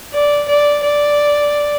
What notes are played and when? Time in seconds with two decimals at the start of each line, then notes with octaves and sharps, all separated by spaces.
0.13 D5
0.48 D5
0.83 D5